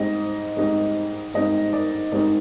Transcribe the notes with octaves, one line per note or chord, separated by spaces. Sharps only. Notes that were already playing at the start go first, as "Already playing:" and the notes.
Already playing: G#2 G3 C4 D#4 D#5
G#2 G3 C4 D#4
G#2 G3 C4 D#4 D#5
D5
G#2 G3 C4 D#4 D5